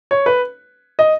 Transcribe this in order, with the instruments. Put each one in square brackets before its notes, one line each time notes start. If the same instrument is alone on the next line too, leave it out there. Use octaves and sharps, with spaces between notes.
[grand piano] C#5
B4
D#5